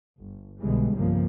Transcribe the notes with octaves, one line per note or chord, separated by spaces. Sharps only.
G1
B1 B2 D3 E3 G3 G#3
G1 C2 C#3 F3 A#3